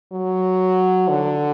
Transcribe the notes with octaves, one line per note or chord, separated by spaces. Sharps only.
F#3
D3